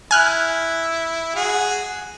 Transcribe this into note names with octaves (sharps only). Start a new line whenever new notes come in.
E4 G#5 F6 F#6
F#4 G#4